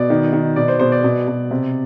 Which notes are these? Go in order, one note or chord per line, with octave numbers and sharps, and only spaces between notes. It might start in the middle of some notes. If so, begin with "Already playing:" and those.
Already playing: B2 D5
D#3
D#3
B2 D5
C5
B2 C5
D5
B2
B2
C3